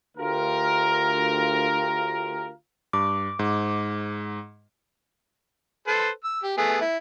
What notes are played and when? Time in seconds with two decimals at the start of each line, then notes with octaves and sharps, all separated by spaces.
0.17 D2 F4 G4 A#4
2.93 G2 D6
3.39 G#2
5.87 A4 B4 C5
6.24 E6
6.43 G4
6.58 A3 B3 G#4
6.81 E4